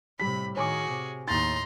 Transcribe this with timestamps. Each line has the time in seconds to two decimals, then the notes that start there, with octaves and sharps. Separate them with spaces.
0.20 A2 C3 G3 B5 B6
0.56 A2 D#3 F#4 G#4 C#5 G#5 D6
0.88 C3
1.28 D#2 A2 D#4 A#5 C6 A6